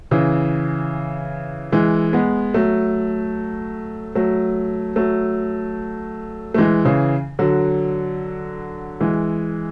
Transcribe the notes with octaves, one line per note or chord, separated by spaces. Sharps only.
C#3 E3
E3 G#3
G#3 B3
F#3 A3
F#3 A3
F#3 A3
A3
E3 G#3
C#3 E3
D3 F#3
E3 G#3